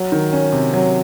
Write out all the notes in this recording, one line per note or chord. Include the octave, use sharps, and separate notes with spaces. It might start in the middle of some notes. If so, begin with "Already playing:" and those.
Already playing: F#3
D#3
C#4
C3
F#3